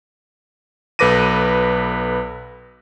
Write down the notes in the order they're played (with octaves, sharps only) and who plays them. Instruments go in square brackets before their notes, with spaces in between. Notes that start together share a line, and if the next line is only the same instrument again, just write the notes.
[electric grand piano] B1 A4 B4 D6 A#6 D#7